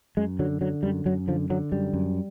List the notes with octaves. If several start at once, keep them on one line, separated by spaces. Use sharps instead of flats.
F#2 G#3
D3 F#3
D3 F#3
F#2 G3
F#2 F#3
D3 F3
D3 F#3
F#2 G3
F#2